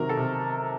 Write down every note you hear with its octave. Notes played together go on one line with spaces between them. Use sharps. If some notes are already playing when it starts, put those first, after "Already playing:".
Already playing: C3 D#3 F#3 A#4
A4
C3